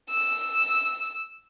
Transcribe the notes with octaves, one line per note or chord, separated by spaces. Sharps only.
E6